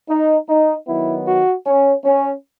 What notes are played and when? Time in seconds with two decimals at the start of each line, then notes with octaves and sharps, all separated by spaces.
0.08 D#4
0.47 D#4
0.86 D#3 F#3 B3 E4
1.26 F#4
1.65 C#4
2.04 C#4